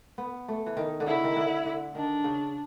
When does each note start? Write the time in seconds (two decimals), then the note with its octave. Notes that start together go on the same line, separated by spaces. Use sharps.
0.18 B3
0.48 A3
0.66 E3
0.77 D#3
1.00 D3
1.06 C#3 E4
1.24 D#3
1.36 D3
1.65 D3
1.95 D#3 D4
2.24 C#3